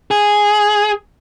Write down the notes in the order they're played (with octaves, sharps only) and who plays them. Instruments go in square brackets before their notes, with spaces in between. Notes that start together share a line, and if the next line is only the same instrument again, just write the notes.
[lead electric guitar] G#4